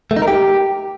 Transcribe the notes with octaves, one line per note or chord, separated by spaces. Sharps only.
A3
D#4
A#4
G4